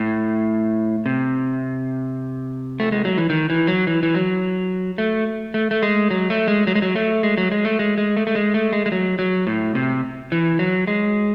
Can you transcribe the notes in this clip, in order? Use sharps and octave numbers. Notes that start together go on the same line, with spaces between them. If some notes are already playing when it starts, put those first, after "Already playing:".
Already playing: A2
C3
A3
G#3
F#3
E3
D#3
E3
F#3
E3
E3
F#3
A3
A3
A3
G#3
F#3
A3
G#3
F#3
G#3
F#3
A3
G#3
F#3
G#3
A3
G#3
G#3
A3
A3
G#3
A3
G#3
G#3
F#3
F#3
A2
C3
E3
F#3
G#3